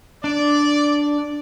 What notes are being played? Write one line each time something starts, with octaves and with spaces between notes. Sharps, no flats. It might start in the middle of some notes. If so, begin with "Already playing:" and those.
D4 D5